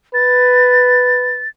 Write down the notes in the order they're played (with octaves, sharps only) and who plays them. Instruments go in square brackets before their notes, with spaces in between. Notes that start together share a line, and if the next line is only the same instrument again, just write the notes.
[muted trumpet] B4 [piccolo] A6